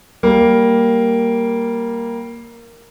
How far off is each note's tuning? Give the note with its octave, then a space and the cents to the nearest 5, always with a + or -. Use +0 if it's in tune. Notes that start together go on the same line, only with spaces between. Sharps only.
G3 -5 A#3 +0